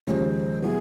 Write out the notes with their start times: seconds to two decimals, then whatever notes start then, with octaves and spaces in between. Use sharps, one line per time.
0.07 D#2 C#3 F3 G#3 C5 C#5
0.62 B2 F#3 B3 E4 G#4